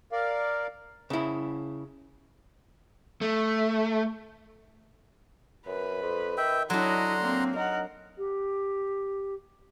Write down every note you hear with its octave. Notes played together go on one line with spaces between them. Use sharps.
A#4 D5 F5
C#3 E4
A3
F#2 B4
F2
D#3 E5 G5
D3 F#3 D4 E4 D#5 F#5 A#5 C6
A#3 C4
D#4 A#4 F#5
G4